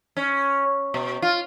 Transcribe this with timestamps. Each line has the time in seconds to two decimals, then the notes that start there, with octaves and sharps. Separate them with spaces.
0.17 C#4
0.94 B2
1.22 F4